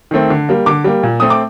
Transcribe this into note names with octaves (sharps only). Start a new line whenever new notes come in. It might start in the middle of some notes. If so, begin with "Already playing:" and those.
D#3 A3 C4
D3
G3 A#3
D3 D6
G3 A#3
A#2
A3 C4 D#6
D6